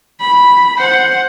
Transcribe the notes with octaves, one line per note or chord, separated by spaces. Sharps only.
B5
C5 F#5